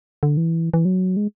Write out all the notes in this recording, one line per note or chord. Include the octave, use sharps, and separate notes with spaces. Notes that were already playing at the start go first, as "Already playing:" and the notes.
D3
E3
E3
F#3
G#3